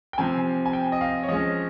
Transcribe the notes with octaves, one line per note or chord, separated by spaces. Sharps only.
G5
C3 F3 C4 G#5
G#5
G5
D#5
F5
C#5
F3 G#3 C#4 D#5